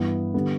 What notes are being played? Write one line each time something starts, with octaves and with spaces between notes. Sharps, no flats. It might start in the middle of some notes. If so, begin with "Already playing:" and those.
Already playing: G2 E3 B3 E4
D3 G3 B3